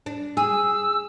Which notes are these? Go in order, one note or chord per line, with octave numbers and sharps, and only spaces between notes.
D4
G#4 E6